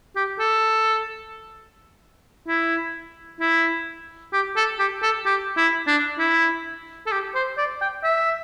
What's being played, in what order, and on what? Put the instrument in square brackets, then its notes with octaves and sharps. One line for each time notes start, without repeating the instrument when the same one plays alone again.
[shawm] G4
A4
E4
E4
G4
A4
G4
A4
G4
E4
D4
E4
A4
G4
C5
D5
G5
E5